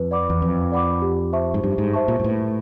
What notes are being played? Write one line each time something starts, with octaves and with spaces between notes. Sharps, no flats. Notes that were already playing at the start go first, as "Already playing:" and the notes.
Already playing: F2 B4
D5 F#5 B5 D6
E2
F2 B4
D5 F#5 B5 D6
G4
C5 E5 A5 C#6
G#2
G2 G4
G#2
C5 E5 A5 C#6
A#2
G#2
A2 B4